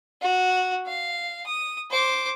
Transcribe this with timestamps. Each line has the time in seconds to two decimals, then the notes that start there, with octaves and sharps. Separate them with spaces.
0.21 F#4
0.86 F5
1.46 D#6
1.90 C5 D6